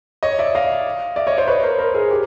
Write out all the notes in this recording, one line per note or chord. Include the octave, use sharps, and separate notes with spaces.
C#5 D#5
D5 E5
D#5 F5
D5 E5
C#5 D#5
C5 D5
B4 C#5
A#4 C5
A#4 C5
G#4 A#4
G4